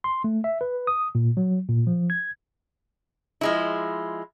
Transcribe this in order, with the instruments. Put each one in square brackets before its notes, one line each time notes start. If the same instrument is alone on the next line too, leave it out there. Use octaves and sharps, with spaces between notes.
[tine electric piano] C6
A3
E5
B4
D#6
A#2
F#3
A#2
F3
G#6
[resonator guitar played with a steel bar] F3 G#3 E4